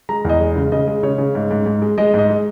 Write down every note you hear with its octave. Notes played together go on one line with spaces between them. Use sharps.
G#3 A#5
E2 D#5
G#3
C#3
C#3 D#5
G#3
C#3 C#5
C#3
G#2
G#2
G#2
G#3
G#3 D#5
G#2 D#5
G#3